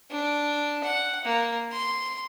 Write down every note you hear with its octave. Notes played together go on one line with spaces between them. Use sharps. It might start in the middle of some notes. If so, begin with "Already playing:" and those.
D4
F#5
A#3
C6